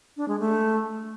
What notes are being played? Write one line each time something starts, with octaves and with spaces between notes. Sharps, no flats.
D4
G#3
A3